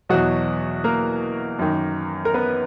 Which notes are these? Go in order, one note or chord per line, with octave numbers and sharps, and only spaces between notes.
E2 B2 F#3 F#4
A#3 A#4
F#2 D#3
A#4
B3 B4